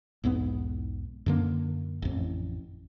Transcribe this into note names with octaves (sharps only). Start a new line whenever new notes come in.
B1 E2 G#2 B3
F#2 D3 A#3
A1 F2